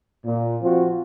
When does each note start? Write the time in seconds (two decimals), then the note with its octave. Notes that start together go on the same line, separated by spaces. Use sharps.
0.25 A#2
0.62 F3 C4 F4 F#4